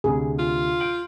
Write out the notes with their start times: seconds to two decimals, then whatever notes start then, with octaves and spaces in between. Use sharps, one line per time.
0.04 D2 C3 G#4
0.39 F4
0.80 G6 D7 F#7